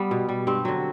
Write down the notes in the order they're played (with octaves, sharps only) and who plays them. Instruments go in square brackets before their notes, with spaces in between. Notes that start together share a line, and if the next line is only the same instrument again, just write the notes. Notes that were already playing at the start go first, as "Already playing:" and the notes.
Already playing: [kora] G3 B3
B2
G3
G2 C4
D3 F#3